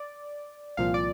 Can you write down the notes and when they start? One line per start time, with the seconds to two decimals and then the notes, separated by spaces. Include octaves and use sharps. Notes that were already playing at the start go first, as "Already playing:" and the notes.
Already playing: D5
0.77 C2 A#2 F3 F5
0.94 D5